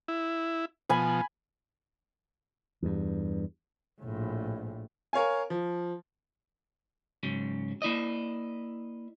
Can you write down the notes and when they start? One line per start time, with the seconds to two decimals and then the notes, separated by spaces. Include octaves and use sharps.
0.08 E4
0.90 B2 F3 G#5 B5
2.82 E2 G2
4.02 A#1 A2
5.13 A#4 C#5 F5 G#5
5.50 F3
7.23 G#2 C#3 F#3
7.82 A#3 E4 D5 D#5